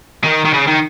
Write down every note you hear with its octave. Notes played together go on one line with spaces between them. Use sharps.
D#3
D#3
C#3
D#3